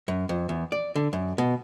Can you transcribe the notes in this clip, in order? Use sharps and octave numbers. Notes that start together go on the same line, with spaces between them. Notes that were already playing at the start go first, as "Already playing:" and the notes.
F#2
F2
E2
D5
D3
F#2
B2